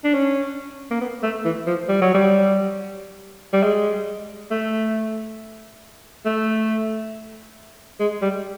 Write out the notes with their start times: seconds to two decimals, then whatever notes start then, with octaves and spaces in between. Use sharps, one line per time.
0.04 D4
0.14 C#4
0.91 A#3
1.01 B3
1.23 A3
1.45 E3
1.67 F3
1.89 G3
2.01 F#3
2.14 G3
3.53 G3
3.63 G#3
4.51 A3
6.25 A3
8.00 G#3
8.22 G3